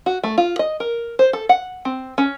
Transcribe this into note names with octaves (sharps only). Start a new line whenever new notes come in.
F#4
A3
F4
D#5
A#4
C5
A4
F#5
C4
C#4